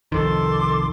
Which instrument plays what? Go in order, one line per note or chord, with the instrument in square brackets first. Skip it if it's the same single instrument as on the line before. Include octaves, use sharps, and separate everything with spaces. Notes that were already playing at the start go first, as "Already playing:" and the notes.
[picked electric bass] C2 F2 D#3 [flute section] A4 C6 D6